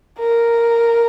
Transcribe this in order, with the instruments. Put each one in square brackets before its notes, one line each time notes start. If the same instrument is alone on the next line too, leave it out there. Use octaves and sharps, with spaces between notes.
[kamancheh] A#4